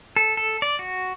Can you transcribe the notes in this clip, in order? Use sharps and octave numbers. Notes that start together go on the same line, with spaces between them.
A4
A4
D5
F#4